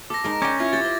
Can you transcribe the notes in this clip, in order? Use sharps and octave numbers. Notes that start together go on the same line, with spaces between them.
A4 D6 A#6
G#3 D#4 A#4
C#4 D5 G5 D6 A#6
E4 F4 F5 G#6
G4 A6
C5